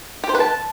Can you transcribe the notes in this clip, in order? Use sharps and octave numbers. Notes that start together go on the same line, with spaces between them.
G4
C5
B4
A5